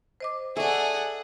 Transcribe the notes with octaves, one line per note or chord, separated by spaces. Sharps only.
C5 D#5 D6
G#4 A4 D5 E5 F#5 G#5 C#6